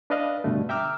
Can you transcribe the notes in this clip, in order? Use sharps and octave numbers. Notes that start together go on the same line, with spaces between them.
D4 B4 D5 D#5 F5
G2 B2 D3 A3
E5 G5 A#5 D6 E6 F6